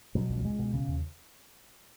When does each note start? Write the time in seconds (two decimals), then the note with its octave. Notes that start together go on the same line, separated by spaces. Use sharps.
0.15 B2 F#3
0.30 C#2
0.37 F#3
0.44 C#2 G#3
0.59 B2
0.74 C#3
0.88 D#2